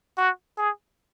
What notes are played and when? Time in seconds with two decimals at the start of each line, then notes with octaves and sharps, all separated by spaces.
0.17 F#4
0.58 G#4